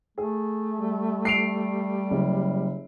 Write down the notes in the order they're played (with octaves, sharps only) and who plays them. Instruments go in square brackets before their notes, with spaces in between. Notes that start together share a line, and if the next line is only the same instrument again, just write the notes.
[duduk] A3 [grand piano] G#4
[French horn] G3
[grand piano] C7 D7 F7
F#1